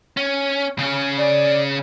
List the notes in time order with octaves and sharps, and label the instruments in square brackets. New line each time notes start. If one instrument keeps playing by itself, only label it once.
[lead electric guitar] C#4
C#3 C#4
[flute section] D5